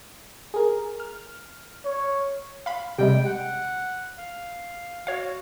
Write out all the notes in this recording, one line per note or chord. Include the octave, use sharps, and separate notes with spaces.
G#4 A#4
F6
C#5
F5 B5
C3 G3 G#3 G5
F#5
F5
F#4 C#5 F5